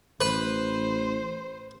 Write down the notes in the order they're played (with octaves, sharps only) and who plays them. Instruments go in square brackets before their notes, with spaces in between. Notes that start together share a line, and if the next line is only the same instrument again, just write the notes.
[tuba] A1 [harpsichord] B4 [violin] C5